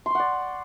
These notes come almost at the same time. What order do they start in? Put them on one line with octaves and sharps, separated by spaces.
C6 C#6 F#5 D5